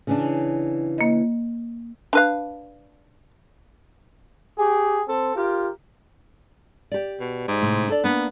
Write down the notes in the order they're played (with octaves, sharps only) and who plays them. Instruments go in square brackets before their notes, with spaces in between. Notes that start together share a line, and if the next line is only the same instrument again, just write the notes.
[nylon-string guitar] C#3 E3 D4
[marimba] A#3 D#5
[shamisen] D4 B4 F5
[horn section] G4 G#4
C4 A4
F4 G4 A#4
[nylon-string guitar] G4 D5
[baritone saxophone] B2
G#2
[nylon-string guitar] A2 C3
D4 A4 D5
[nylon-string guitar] A#3 D4 [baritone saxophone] B3